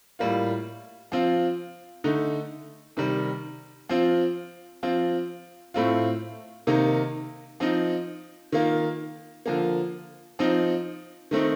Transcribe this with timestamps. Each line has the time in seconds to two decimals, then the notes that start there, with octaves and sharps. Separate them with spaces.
0.19 A2 G3 A#3 F4
1.12 F3 C4 F4
2.04 D3 A3 D#4
2.97 C3 D#3 G3
3.89 F3 C4 F4
4.83 F3 C4 F4
5.74 A2 A3 C4 F4
6.67 C3 D#3 A#3 D#4
7.60 F3 C4 D#4
8.52 D#3 A#3 F4
9.46 D3 F3 A#3
10.39 F3 C4 D#4
11.31 D#3 A3 C4 D#4